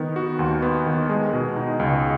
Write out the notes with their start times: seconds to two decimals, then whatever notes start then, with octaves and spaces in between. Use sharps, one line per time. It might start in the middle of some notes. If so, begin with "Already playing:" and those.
Already playing: D#3 B3
0.16 F#4
0.39 D#2
0.62 B3
0.86 D#3
1.09 G#3
1.33 B2
1.56 D#4
1.80 C#2